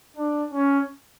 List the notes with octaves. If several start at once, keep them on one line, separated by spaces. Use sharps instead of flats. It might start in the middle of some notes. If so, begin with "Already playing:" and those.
D4
C#4